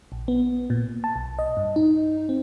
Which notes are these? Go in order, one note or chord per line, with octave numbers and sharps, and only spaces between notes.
A#1
B3
A#2
A5
B1
D#5
G2
D#4
C4